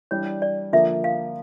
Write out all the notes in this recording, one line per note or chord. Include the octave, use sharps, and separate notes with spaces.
E3 G3 D4 C#5
D5
D3 F3 A#3 E5
F5